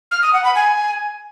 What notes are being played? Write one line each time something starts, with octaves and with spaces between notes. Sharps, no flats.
F6
D#6
F#5
B5
G#5